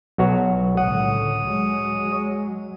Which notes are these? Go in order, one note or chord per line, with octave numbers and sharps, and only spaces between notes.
B1 F#4 C#5
C#2 A2 D3 C#5 F#5 D#6
F#3 G#3